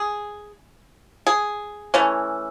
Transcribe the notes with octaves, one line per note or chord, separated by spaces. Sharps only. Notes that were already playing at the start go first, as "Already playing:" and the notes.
Already playing: G#4
G#4
E3 A3 C#4